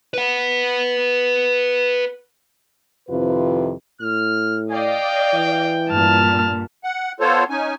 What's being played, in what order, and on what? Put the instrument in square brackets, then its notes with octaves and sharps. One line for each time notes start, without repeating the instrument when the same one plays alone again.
[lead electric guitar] B4 F#5
[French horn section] F2 C3 D#3 E4 F4 B4
[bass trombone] A2 [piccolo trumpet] F6
[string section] D5 D#5 F5 [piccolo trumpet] G5
[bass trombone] E3
[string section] G2 A#2 [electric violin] A5 F6
[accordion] F#5
B3 F4 A4 C5 C#5
C#4 D#4 G#5